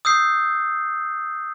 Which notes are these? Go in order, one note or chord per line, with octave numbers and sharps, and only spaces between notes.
D#6 E6 G6 C7